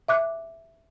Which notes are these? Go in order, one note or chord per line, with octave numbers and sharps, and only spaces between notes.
E5 D6 F#6